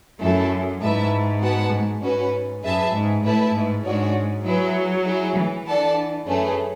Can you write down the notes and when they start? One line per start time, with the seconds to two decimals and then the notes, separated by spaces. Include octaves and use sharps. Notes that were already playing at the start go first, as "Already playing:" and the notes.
0.20 F#2 A3 E4 A4 E5
0.80 G#2 E4 B4 E5 A5
1.41 B3 F#4 B4 F#5 A5
1.72 G#2
2.01 G#2 C#4 F#4 B4
2.63 F#2 G#4 B4 E5 A5
2.93 G#2
3.24 A2 E4 B4 E5 A5
3.53 G#2
3.84 G#2 D4 F#4 C#5
4.44 F#3 E4 G#4 B4 E5
5.06 E4 G#4 C#5 E5
5.36 E3
5.66 E3 D4 A4 D5 F#5 A5
6.27 F#2 A3 C#4 G#4 B4